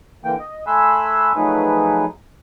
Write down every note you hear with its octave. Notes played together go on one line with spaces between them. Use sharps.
D3 E3 A#3 G5
D#5
A3 G#5 B5 C6 E6 F#6
F3 F#3 A3 D#4 G#4 B4